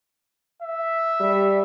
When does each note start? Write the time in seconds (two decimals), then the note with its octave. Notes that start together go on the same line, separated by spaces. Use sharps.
0.62 E5
1.20 G3